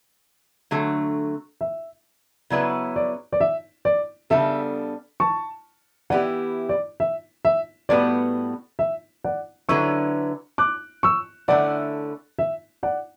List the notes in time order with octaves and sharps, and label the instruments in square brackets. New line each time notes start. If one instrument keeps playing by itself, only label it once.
[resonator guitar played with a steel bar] D3 F#3 A3
[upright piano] E5
[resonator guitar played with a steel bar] C#3 F#3 B3 E4 B4 [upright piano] D5
[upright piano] D5
D5
E5
D5
[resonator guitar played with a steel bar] C#3 G3 B3 D4 A4 [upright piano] E5
[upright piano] A5 C#6
[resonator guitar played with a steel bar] E3 B3 E4 G4 [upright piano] D5 F#5
[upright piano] D5
E5
E5
[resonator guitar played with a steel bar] A2 G3 B3 F#4 B4 [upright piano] D5
[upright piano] E5
D5 F#5
[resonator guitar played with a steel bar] D3 F#3 C#4 E4 B4 [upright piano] C#6 E6
[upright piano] D6 F#6
C#6 E6
[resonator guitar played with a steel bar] D3 A3 C#4 E4 [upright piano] D5 F#5
[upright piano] E5
D5 F#5